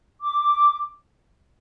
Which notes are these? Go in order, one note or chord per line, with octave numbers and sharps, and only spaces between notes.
D6